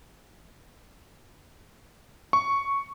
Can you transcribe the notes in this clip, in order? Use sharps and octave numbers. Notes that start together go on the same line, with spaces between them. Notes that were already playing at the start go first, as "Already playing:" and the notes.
C#6